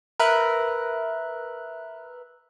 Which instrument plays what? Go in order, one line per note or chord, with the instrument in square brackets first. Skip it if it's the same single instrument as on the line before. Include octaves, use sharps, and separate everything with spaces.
[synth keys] A#4 B4 E5 F#6